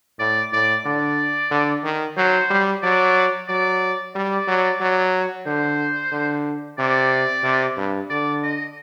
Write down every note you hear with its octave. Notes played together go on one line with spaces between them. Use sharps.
A2 D5
A2 D5
D3 D5
D3
D#3
F#3 C5
G3
F#3 D5
F#3 D5
G3 D5
F#3
F#3
D3 C5
D3
C3 D5
C3
G2
D3 D5
D#5